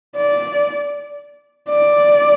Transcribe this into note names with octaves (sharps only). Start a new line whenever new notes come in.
D5
D5